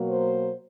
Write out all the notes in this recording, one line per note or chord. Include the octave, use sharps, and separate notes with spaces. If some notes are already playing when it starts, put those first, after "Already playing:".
Already playing: B2 F#3 A#3
C5